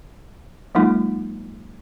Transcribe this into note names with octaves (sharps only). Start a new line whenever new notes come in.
F#3 G#3 A#3 D#4 F4